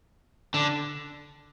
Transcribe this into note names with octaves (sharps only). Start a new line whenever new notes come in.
D3